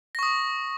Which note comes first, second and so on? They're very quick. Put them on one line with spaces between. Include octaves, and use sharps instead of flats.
A#6 C#6 D#6